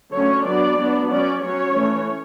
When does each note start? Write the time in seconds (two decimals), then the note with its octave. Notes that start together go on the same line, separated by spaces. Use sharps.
0.13 D3 F#3 A3 C#4 C#5
0.45 F#3 B3 D4 D5
0.78 F#3 B3 D4
1.10 F#3 C#4 D5
1.42 F#3 C#4 C#5
1.74 E3 A3 C#4